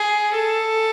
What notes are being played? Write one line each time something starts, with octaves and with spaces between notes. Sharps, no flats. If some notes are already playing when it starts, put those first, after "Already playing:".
Already playing: G#4
A4